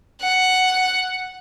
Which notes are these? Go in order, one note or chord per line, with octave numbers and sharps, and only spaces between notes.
F#5